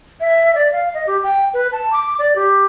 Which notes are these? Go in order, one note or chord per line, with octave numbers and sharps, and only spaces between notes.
E5
D5
F5
D#5
G4
G5
B4
A5
D6
D5
G4